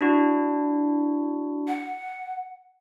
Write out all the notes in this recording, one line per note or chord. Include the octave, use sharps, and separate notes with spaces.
D4 E4 F#4
F#5